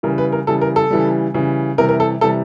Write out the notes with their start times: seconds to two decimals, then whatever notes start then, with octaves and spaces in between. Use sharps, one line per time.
0.03 C#3 E3 G3 A#4
0.18 B4
0.32 A#4
0.47 C#3 E3 G3 A4
0.61 A#4
0.76 A4
0.91 C#3 E3 G3
1.34 C#3 E3 G3
1.78 C3 E3 G3 A#4
1.89 A#4
2.00 A4
2.21 C3 E3 G3 A4